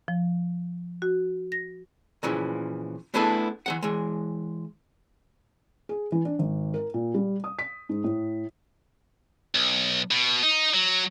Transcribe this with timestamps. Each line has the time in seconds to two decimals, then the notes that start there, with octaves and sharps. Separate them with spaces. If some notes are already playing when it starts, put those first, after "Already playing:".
0.08 F3
1.02 F#4
1.52 A#6
2.23 A#2 C#3 E3 F3
3.14 A3 B3 D4 E4 G#4 A4
3.66 E3 F3 F#5
3.82 E3 G#3
5.89 G#4
6.12 E3
6.25 D4
6.39 G#1
6.74 A#4
6.94 A#2
7.14 G3
7.44 D#6
7.59 B6
7.89 G#2
8.04 A2
9.55 B1
10.11 B2
10.43 D#4
10.74 F#3